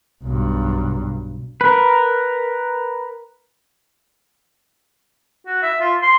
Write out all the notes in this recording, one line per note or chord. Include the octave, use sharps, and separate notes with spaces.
B1 G2
A#4 B4
F#4
E5
F4
C6